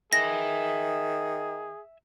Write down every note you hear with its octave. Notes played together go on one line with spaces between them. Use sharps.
D#3 G#4 E5 G#5 A#6